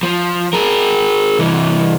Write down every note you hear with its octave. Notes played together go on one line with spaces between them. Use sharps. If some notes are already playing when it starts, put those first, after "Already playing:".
F3
G#4 A#4
C2 E3